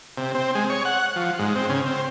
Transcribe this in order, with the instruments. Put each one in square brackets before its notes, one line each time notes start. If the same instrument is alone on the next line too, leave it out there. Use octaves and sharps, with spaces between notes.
[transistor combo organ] C3
C4
G#3
C#5
F#5
F3
G#2
C4
C#3
C4